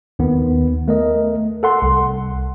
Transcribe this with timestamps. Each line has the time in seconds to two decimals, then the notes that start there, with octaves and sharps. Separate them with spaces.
0.19 D#2 D#3 B3
0.88 A3 A#4 D#5
1.63 A4 F#5 C6
1.82 C2